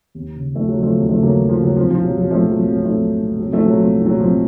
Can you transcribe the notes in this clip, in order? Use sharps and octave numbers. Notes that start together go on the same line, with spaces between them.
D#2
C#3
D#2 F3 A3
F#3
C#3
F3 A3
D#2 F#3
F3 A3
C#3
F#3 A#3
D#2
F3
C#3
F#3
C2 F3
F3
A#2
F#3
C2 F#3
F3 A3
A#2
F#3
C2 F#3
F#3
A#2
F3 A3
C2
A#2
C2 F#3
F3 A3
A#2
F#3
C2 F3
A#2
F#3
C2 F3